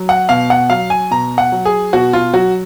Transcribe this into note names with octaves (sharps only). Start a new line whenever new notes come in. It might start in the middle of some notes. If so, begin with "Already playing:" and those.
Already playing: F#3
F#5
B2 F5
F#5
F#3 F5
G#5
B2 A#5
F#5
F#3
G#4
B2 F#4
F4
F#3 F#4